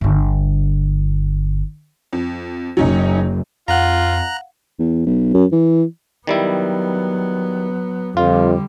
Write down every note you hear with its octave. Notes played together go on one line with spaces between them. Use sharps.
G1 D3
F2
F#1 F#3 C#4 D#4
F2 F4 F5 F#5 A#5 F#6
E2
B1
F#2
E3
D#3 F#3 G3 B3 E4
F2 D3 G3 F4